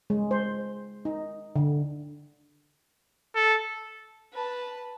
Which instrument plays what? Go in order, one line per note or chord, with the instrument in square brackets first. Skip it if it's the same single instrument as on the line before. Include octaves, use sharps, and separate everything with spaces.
[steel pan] G#3
C5
D#4
D3
[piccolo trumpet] A4
[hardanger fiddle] B4 A5